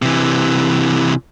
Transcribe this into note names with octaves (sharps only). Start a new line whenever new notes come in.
C3 E3